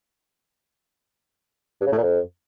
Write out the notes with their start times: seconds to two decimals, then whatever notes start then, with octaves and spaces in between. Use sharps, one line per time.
1.81 G2
1.87 C#3
1.92 A2
1.98 A#2
2.03 F2